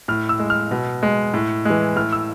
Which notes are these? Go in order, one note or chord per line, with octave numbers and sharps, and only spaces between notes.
A2 F6
E6
G#3
F6
B2
G#3
A2
E3 G#3
A2 F6
E6